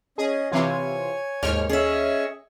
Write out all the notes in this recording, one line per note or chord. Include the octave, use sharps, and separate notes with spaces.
C#4 G#4 D#5
C3 E3 F4 C#5 G#5
D#2 G#2 C#5 F6
C#4 G#4 D#5 E5 C#6